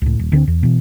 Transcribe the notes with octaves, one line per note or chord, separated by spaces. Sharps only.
C#2 A2
D#1
D2 D3 A#3 C4
E2
B2 E3